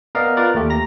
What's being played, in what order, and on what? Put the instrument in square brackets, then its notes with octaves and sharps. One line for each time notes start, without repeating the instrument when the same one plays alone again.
[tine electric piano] B3 A#4 D5 D#5 F5
F4 A#4 B4 D5
D#2 A3 G4
A#5 A#6